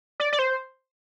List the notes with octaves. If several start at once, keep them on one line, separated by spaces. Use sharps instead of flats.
D5
D5
C5